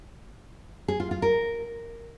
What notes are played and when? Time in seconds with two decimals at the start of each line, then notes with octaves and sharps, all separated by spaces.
0.88 G#4
1.00 F4
1.11 F4
1.22 A#4